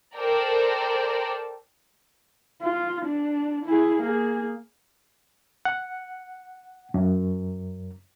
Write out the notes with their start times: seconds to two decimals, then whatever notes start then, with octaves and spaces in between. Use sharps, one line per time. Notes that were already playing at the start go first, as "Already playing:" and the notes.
0.16 A4 A#4 C5 D5 G5
2.61 F4
3.05 D4
3.65 E4 G#4
4.01 A#3 G#4
5.65 F#5
6.94 F#2